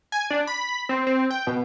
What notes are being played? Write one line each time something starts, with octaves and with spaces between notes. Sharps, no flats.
G#5
D4
B5
C4
C4
G5
B2